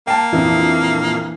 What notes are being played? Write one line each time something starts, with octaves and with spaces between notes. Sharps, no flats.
A#3 G5 A5
A#1 F2 E3